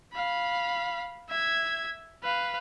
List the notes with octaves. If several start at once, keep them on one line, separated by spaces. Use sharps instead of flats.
F5 B5
E5 G#6
B4 F5